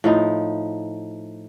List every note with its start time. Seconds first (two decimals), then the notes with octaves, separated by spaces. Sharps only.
0.04 A2 F3 D#4